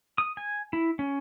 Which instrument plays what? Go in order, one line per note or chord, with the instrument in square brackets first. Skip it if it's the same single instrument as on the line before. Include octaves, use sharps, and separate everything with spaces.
[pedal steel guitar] D#6
G#5
E4
C#4